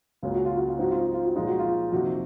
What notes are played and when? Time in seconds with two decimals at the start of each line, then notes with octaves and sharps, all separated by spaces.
0.23 C#2 C#3 F#3 A#3 C#4 F4
0.34 F#4
0.45 F4
0.57 F#4
0.68 F4
0.79 G#2 F#3 C4 D#4 F#4
0.91 F4
1.03 F#4
1.14 F4
1.25 F#4
1.36 A#2 F3 G#3 D#4 F4
1.47 F#4
1.59 F4
1.92 F2 C3 D#3 A#3 F#4